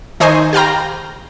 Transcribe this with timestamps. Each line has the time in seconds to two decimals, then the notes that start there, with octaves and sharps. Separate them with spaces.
0.20 D#3 D#4 C5 G#5 C#6
0.53 G4 F5 G5 A#5